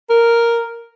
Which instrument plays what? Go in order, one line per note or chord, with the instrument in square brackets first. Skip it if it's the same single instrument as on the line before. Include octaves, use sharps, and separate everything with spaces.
[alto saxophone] A#4